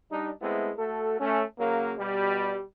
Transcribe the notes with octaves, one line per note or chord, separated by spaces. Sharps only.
G3 D4 D#4
G#3 A3 B3 C4 E4
A3 F#4 A4
A3 C#4
C#3 F#3 A#3
B2 G3